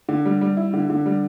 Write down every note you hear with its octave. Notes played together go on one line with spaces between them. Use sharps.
D3
G3
G3
E4
D3
D3
G3